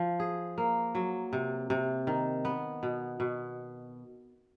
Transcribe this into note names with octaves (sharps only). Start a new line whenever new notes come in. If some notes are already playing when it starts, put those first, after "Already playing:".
Already playing: F3
G#4
A#3
F#3
C3
C3
D#3
B3
B2
B2